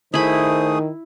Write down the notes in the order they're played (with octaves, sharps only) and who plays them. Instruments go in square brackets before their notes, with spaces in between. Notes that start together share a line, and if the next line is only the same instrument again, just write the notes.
[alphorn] D#3 [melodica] A3 G#4 D#6 [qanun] E4 B5 [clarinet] C5